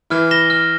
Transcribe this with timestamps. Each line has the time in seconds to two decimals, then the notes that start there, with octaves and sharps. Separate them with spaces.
0.10 E3 E4 F6
0.31 A#6 E7 G7
0.50 F6